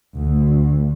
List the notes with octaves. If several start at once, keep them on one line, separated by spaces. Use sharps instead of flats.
D2